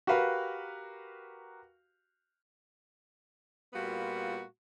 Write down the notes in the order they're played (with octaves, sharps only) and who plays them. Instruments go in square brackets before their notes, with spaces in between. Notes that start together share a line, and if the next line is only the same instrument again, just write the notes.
[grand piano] F#4 G4 A#4 B4 F5
[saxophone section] A#2 G3 A#3 B3 F4 F#4